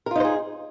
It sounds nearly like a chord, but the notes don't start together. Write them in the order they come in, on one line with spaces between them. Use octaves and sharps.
A#4 F4 D#4 C5 G#4